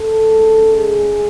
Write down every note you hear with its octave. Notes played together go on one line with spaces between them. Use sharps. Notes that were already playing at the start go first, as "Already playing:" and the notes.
Already playing: A4
C#3 G#3
G#4